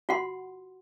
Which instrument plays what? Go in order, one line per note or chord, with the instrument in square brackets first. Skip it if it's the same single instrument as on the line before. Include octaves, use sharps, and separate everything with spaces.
[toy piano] F4 F#4 F#5 C6